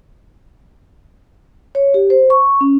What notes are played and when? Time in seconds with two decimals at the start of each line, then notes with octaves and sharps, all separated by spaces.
1.75 C#5
1.94 G4
2.10 C5
2.30 C#6
2.61 C#4